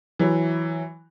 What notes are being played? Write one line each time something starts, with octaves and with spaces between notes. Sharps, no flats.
E3 F#3